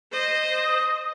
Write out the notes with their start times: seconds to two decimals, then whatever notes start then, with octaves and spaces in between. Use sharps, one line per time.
0.12 C5 D#5
0.64 D#6